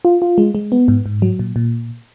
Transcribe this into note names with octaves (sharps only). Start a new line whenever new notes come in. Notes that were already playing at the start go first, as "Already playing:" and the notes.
F4
F4
G#3
G#3
B3
G#2
G#2
F#3
A#2
A#2